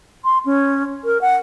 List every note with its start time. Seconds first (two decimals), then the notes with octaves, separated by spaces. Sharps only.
0.25 C6
0.46 C#4
1.04 A#4
1.21 F#5